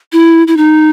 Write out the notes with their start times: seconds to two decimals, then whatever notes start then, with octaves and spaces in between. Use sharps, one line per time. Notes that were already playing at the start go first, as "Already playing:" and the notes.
0.13 E4
0.47 E4
0.57 D#4